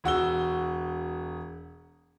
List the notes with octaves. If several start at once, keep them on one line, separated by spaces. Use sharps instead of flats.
E1 F#4 E6 G7